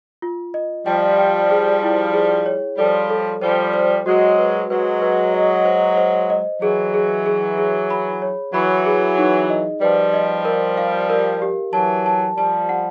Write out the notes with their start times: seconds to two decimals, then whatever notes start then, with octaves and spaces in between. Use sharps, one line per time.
0.22 F4
0.54 D#5
0.86 F3 G3 G5
1.18 G5
1.51 G#4
1.83 E4
2.14 G#4
2.46 C#5
2.78 F3 G3 A4
3.10 A4
3.42 F3 G3 C5
3.73 C5
4.06 F#3 G#3 F#4
4.39 B4
4.70 F#3 G#3 B4
5.02 B4
5.34 D#5
5.65 C5
5.97 C5
6.30 D#5
6.61 E3 F#3 G#4
6.94 G#4
7.26 G#4
7.58 G#4
7.90 B5
8.22 C#5
8.53 E3 F#3 B5
8.86 G#4
9.18 D#4
9.50 D#5
9.81 F3 G3 B4
10.14 D#5
10.45 A#4
10.77 F5
11.10 A#4
11.42 G4
11.73 E3 F#3 A5
12.06 A5
12.37 F3 G3 A5
12.69 F#5